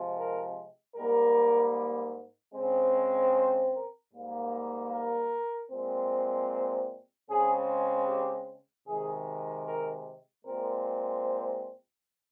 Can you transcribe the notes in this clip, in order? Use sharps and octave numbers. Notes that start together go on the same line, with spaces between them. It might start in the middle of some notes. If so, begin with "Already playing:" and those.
Already playing: C3 F3 G#3 C4
A#4
G#2 G3 A#3 A#4
C#3 G#3 C4
C5
A#4
G#2 G3 A#3
A#4
A#2 G#3 C4
C#3 G#3 C4 G#4
G4
C3 D#3 G#3 G#4
A#4
A#2 G#3 C4 A#4
C5